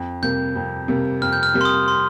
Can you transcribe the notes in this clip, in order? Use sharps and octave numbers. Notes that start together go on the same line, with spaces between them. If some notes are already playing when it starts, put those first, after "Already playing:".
Already playing: F2
C3 G3 A#3 G6
F2
C3 G3 A#3
F2 F6
G6
F6
C3 G3 A#3
C6
D#6
C6